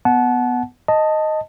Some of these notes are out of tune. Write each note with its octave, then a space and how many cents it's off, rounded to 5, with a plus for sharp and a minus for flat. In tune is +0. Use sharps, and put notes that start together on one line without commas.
B3 +0 F#5 +0 A5 -30
D#5 +0 A5 +10